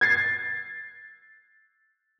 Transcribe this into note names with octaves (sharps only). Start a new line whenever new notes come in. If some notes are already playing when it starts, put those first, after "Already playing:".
G#6 A6 C7